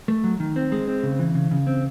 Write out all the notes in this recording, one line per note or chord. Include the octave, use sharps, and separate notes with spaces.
A3
F#3
D#3
C4
G#3
C4
C#3
E3
C#3
C#3
C4